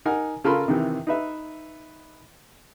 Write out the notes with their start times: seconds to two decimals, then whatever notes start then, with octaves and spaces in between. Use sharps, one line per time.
0.05 D#4 A#4 F#5 G#5
0.44 C#3 F4 A4 A#4 B5 C6
0.68 C3 D#3 E3
1.07 D#4 B4 E5